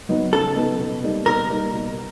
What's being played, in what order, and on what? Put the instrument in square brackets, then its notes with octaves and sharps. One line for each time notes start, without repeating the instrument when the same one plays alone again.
[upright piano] F#3 B3 D#4
[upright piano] C#3 [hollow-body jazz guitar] A4
[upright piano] F#3 B3 D#4
B2
G3 A#3 D#4
[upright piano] B2 [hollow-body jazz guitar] A#4
[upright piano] G3 A#3 D#4
B2